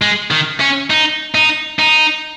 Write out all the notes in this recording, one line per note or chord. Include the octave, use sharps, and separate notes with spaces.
G#3
D#3
C#4
D#4
D#4
D#4